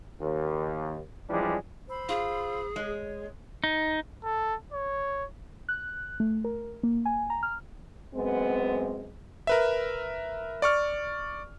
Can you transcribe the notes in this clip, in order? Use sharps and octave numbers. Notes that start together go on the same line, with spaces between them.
D#2
E3 F3 G3 G#3 C#4 D4
C5 B5 E6
F4 G#4
G#3 C#5
D#4
A4
C#5
F#6
A3
A#4
A#3
G#5
A#5
F6
F#2 G#3 B3 C4
A#4 B4 E5
D5 C#6 F6